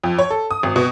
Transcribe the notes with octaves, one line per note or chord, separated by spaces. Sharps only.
F2
C#5
A4
D#6
G#1
B2